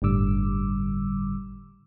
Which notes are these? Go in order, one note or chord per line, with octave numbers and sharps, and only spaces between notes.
G1 A2 D3 G3 D6 E6